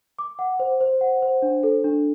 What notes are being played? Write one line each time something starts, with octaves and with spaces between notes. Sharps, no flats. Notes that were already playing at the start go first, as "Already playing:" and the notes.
D6
F#5
C5
C5
F#5
C5
D4
A4
D4